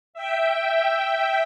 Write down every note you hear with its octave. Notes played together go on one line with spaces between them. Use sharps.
E5 G5